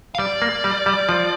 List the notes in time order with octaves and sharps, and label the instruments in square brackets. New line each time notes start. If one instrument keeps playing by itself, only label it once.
[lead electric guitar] F5
[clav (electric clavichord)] G3 [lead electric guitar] D5
[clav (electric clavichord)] A#3
G3
G3
F3